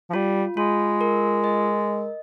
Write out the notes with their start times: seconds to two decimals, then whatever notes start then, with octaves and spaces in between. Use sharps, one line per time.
0.10 F3
0.13 G3 F4
0.57 G#3 F4
1.01 A#4
1.44 D#5